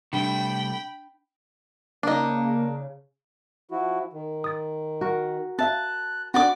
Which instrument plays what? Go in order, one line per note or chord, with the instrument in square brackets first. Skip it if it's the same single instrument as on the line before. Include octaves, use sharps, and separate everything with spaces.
[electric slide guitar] C3 G3 A3 [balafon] D4 [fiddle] G5 B5
[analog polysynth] C#3 [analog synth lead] A#3 [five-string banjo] D4 D#4
[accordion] F3 E4 F#4
D#3
[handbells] D#6 A6
[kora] F#4 A#4
[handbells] C4 E5 F5 [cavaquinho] A5 [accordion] F#6
[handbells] C4 D4 [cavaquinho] F#4 D5 D6 [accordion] B5